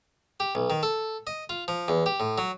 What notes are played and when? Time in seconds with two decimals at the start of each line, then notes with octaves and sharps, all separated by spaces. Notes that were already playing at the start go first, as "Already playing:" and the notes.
0.40 G4
0.55 B1
0.70 D#3
0.83 A4
1.27 D#5
1.49 F4
1.68 F3
1.88 E2
2.06 G4
2.20 A2
2.38 F#3